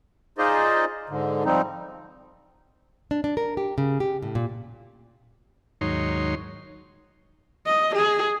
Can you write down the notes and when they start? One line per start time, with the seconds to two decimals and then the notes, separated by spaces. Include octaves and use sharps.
0.38 D#4 F4 G#4 C5 D5 D#5
1.09 G#2 D3
1.45 F3 G3 C4 D#4
3.11 D4
3.24 D4
3.37 A#4
3.57 G4
3.78 C#3
4.00 G4
4.23 A2
4.35 A#2
5.81 D#2 G#2 F#3 D#4 C#5 C6
7.67 D#5
7.96 G#4